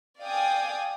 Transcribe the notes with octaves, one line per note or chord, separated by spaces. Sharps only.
D5 F5 G5 G#5 D6 D#6